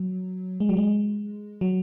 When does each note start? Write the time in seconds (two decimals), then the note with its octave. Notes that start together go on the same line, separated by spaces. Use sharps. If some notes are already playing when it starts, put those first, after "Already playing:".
Already playing: F#3
0.60 G#3
0.69 F#3
0.77 G#3
1.61 F#3